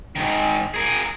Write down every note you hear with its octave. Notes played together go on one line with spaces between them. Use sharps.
G#2 D#3
G#4 A#4